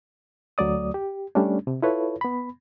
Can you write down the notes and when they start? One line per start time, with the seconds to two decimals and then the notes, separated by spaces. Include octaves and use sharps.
0.58 D2 F#3 A3 D5 D#6
0.94 G4
1.35 G3 A3 C#4 D4
1.67 C3
1.82 E4 F4 A4 B4 C#5
2.21 B3 B5